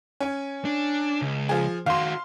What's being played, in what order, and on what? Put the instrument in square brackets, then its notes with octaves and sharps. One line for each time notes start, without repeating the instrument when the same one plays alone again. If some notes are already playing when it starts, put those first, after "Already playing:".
[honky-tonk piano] C#4 G#5
[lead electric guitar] D4
C#2
[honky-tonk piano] F3 G#4
[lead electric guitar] D#3 F#4 [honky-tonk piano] F5 C6